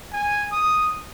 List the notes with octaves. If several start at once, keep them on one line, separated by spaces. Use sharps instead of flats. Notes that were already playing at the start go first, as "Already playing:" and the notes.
G#5
D#6